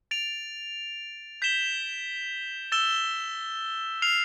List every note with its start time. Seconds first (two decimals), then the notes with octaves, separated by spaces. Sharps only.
0.11 A6 D7 F7
1.42 G6 B6 E7 G7
2.72 E6 A6 E7 G7
4.02 F6 C7 F7